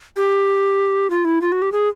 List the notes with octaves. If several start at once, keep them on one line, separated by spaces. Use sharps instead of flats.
G4
F4
E4
F4
F#4
G4
G#4